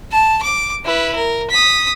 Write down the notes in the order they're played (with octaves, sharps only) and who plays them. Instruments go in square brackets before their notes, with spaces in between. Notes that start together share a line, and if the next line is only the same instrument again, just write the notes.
[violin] A5
D6
E4 B4
A#4
D#6 B6